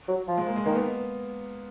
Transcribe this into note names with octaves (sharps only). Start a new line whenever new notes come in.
F#3
F3
G#3
A#3
G#3
D#3 A#3
B3